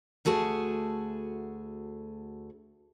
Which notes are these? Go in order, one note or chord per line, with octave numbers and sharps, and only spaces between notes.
D2 A3 F#4 G#4 A5